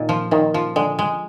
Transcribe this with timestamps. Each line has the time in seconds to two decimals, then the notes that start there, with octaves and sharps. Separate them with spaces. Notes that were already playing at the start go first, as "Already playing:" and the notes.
Already playing: A#2 D#3
0.09 F3
0.31 A#2 D#3
0.54 F3
0.76 D3 G#3
0.99 G#3